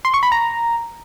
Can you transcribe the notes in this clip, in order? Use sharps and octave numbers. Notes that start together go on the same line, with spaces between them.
C6
C#6
B5
A#5